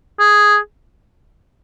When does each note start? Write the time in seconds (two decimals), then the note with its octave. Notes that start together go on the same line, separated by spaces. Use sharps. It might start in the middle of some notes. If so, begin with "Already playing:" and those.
0.20 G#4